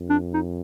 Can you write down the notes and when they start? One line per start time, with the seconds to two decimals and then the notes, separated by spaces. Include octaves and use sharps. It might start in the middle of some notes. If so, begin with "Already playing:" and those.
Already playing: F2
0.10 D4
0.33 D#4